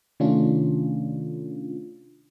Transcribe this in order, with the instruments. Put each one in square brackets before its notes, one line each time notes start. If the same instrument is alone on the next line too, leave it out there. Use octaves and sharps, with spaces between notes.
[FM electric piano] C3 D#3 A3 C#4 D4 F4